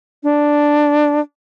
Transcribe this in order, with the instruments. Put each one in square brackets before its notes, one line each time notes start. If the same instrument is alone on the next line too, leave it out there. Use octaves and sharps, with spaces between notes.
[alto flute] D4